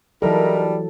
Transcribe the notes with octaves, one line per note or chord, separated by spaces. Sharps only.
E3 F#3 G3 D#4 E4 A4 A#4